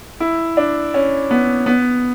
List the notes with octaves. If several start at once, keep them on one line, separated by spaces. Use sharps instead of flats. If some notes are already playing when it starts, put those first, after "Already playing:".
E4
D4
C#4
B3
B3